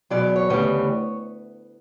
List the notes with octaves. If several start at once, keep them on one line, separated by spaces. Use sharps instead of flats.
E2 B2 F#3 B3 D5
D5
C#5
D2 C#3 E3 G3 B3